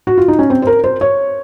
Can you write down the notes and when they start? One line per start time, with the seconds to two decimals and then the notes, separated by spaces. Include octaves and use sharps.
0.07 F#4
0.18 F4
0.28 D#4
0.39 C#4
0.50 C4
0.62 C5
0.67 A#4
0.84 C5
1.01 C#5